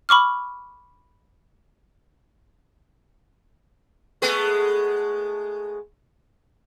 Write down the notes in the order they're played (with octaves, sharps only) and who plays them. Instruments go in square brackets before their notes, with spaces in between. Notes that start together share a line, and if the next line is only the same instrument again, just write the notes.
[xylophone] B5 C#6 D6 F6
[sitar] G#3 A3 B3